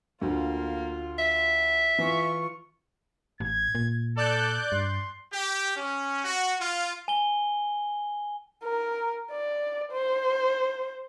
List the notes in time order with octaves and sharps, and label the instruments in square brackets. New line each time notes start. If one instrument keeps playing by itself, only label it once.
[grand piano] D2 [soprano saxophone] A#3 [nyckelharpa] F4
[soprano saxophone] E5
[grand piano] E3 [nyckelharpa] F4 C#6
[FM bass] A1 [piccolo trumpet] G#6
[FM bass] A#2
[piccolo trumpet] A4 [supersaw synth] D5 F#6 G6
[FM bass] G2 [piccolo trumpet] C6
[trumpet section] G4
C#4
F#4
F4
[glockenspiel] G#5 G7
[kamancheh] A#4
D5
C5